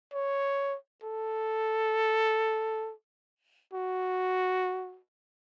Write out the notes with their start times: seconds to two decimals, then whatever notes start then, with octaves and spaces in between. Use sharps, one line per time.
0.13 C#5
1.04 A4
3.74 F#4